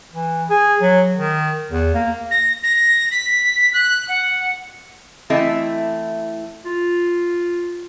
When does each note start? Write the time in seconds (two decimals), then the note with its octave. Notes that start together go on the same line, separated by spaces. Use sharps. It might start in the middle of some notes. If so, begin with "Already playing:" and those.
0.13 E3
0.50 G#4
0.82 F#3
1.16 D#3
1.71 E2
1.94 A#3
2.31 A#6
2.64 A#6
3.11 B6
3.73 F#6
4.08 F#5
5.30 E3 A3 C4 E4 D#5 E5
6.65 F4